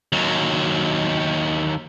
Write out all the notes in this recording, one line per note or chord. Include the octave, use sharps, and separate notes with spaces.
D#2 F#3